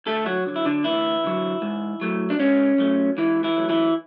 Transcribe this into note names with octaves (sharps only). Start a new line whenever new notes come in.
D2 A3 A4
F#3 F#4
D3 F#3
E4
D3 D4
D2 E3 E4
D3 F#3
G#2
F#3 A3
D4
G#2 C#4
F#3 A3
G#2 E3 E4
E3 E4
F#3 A3
E3 E4